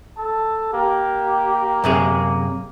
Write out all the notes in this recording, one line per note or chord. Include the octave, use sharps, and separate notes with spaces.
A4 A5
A#3 G4
F#2 C3 G#4